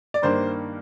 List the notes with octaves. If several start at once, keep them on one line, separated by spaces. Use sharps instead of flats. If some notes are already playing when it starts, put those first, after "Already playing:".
D5
G2 D#3 A#3 D4 C5